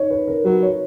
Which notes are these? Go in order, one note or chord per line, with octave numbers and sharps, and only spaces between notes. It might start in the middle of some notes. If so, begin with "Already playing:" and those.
Already playing: D#4 C#5
B4
A#4
F#3 B4
C#5